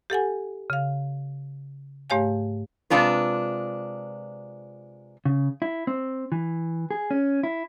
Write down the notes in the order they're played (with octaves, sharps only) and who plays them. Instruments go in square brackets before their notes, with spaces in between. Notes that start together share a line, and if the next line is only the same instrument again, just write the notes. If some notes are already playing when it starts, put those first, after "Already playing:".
[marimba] G4 A4 F#5 G#5
C#3 F5
G#2 A3 G4 C#5 F5 G#5
[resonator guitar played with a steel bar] C3 G#3 D4 F4 B4
[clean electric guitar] C#3
E4
C4
E3
G#4
C#4
E4